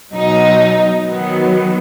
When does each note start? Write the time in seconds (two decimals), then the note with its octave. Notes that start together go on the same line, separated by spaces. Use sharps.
0.11 B2 F#3 D#4
1.05 D#3 F#3 B3